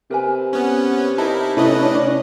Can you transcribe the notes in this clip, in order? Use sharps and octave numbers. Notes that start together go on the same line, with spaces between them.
C3 A#4 B4 G#5
B3 C#4
D#4 E4 A#4 A5
A2 C3 C#4 E4 A4 B4 D#5
C#4 D4